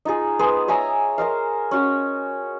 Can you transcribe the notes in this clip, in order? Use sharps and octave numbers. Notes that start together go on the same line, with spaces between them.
D#4 F4 G#4
B3 G#4 C5
C#5 E5 G#5 A#5
A#4 C5 D#5 F5
C#4 F#4